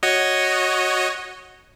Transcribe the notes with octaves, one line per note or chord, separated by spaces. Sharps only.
F#4 C#5 D#5